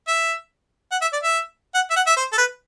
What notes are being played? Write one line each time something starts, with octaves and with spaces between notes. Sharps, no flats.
E5
F#5
E5
D5
E5
F#5
E5
F#5
E5
C5
A4
B4